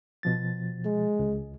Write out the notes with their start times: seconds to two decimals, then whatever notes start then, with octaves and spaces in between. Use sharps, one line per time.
0.23 B2 F3 A6
0.85 G#3
1.19 C#2